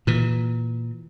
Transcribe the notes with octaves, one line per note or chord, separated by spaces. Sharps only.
A#2 E3